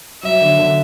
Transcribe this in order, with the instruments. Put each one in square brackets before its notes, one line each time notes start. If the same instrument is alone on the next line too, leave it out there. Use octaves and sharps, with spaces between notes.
[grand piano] F#3 [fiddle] E5
[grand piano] D3
D3